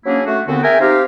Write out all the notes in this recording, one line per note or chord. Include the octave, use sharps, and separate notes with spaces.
F#3 A#3 C#4 D4 E4 G#4
A3 F#4
D#2 D3 B3 C4 F#4 F#5
G#4 A#4 E5 G5 G#5 A#5
C4 D#4 G4 F5